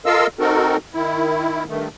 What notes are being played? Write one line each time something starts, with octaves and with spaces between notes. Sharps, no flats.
F4 A4 A#4 D#5 F5 E6
C4 D#4 F#4 A4 A#4
D#3 E4
G2 D#3 A3